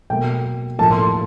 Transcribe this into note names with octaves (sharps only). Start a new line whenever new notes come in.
B2 F#3 A#3 G5
A2 F3 A#3 A5
C6